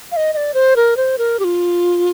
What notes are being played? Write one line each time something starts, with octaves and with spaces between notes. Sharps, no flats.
F5
D#5
D#5
D5
C5
A#4
C5
A#4
G4
F4